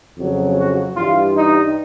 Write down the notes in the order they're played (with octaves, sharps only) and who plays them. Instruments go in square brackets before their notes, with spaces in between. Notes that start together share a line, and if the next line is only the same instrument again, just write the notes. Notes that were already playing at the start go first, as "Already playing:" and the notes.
[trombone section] F2 C#3 F#3
F#4
G2 E3 G3 F4
D#4